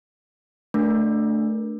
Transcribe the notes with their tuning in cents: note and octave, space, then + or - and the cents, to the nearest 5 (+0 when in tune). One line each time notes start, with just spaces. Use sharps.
A3 +0 D4 +0 A#4 +35